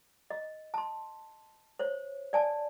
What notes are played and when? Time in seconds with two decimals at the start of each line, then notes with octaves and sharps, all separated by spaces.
0.30 D#5
0.74 A5 C6
1.79 C5 C#5
2.33 D5 G#5 A5